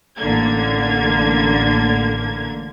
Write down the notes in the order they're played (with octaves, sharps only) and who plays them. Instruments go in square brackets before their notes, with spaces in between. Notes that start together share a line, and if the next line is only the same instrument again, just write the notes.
[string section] A1 D3 A#3 G#6